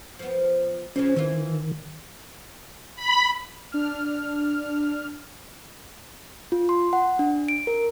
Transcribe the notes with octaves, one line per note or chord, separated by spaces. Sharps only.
F3 B3
C#3 F3 C#4
D#3 E3 F4
B5
D4 F6
F4
C6
F#5
D4
D7
A#4